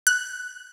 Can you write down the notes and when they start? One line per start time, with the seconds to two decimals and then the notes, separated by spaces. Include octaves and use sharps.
0.07 F#6